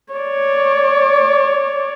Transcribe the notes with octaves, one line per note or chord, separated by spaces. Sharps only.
C#5 D5